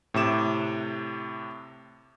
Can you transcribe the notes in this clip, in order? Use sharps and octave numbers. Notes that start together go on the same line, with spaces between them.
A2 C3 D6 E7